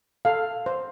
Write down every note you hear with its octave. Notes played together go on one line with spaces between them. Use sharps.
A4 F5
C5